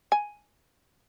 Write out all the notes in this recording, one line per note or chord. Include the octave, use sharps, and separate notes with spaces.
G#5